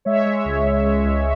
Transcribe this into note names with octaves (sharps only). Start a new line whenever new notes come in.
G#3 C#5 E5
G#3
C#2
C#2
G#3
C#2